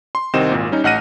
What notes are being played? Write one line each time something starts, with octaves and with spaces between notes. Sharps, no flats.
C6
C2 D#3 C4 G4 D#5 E7
G#1 A#2
G3 C#4 D#4
A1 D#5 F#5 F6 A#6 D#7